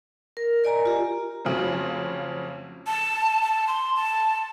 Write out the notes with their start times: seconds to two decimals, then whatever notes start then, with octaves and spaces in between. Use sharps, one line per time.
0.37 A#4
0.64 A#4 D5 D#5 G#5 A#5
0.86 F4 G4
1.45 F2 C#3 F3 F#3 A3 C4
2.87 A5
3.43 A5
3.67 C6
3.96 A5